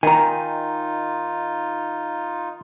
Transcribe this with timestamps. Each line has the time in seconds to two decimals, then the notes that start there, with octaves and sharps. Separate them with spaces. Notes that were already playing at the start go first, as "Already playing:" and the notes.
0.03 D#3 D#4 F4 G#5 A#5